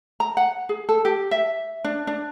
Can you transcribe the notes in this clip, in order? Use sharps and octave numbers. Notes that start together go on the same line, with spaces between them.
A#5
F#5
G#4
A4
G4
E5
D4
D4